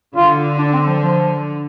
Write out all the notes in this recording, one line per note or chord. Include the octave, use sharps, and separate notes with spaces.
D3 F4
D4
C4
F3
F3